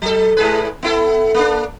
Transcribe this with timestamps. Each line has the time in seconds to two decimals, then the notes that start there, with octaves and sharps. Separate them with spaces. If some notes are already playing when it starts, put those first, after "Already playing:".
0.02 F#3 A4
0.37 G#2 G#4 B4
0.83 B3 E4 A4
1.34 A#3 D4